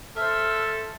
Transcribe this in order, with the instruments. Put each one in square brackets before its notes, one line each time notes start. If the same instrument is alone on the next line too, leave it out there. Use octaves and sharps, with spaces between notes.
[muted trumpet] A4 [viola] C5 E5 [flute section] F6